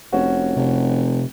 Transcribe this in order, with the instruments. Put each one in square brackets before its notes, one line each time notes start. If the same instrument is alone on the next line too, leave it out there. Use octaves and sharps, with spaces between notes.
[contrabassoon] F1 [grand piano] C#4 F#4
[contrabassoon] F1 [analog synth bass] C3